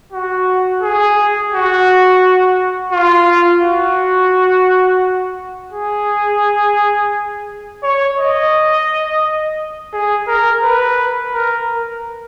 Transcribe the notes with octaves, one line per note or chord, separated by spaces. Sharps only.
F#4
G#4
F#4
F4
F#4
G#4
C#5
D#5
G#4
A#4
B4
A#4